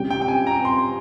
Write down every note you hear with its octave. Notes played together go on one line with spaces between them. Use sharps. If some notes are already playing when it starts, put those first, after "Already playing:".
Already playing: C3 G3 C#4 G4 G5
G5
G5
G#5
A#5
C6